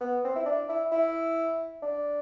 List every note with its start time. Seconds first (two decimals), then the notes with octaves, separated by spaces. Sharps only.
0.01 B3
0.24 C4
0.36 E4
0.46 D4
0.69 E4
0.92 E4
1.82 D4